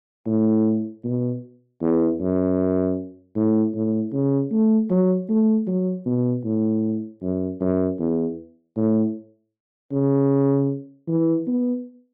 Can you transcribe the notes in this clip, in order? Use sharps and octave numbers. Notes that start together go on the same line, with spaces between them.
A2
B2
E2
F#2
A2
A2
C#3
A3
F#3
A3
F#3
B2
A2
F#2
F#2
E2
A2
C#3
E3
B3